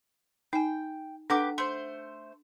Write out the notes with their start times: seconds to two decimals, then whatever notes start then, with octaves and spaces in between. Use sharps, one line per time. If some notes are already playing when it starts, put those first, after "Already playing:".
0.53 D#4 G5 G#5
1.30 B3 D4 G4 A4 F#5 D6
1.58 A3 C5 C6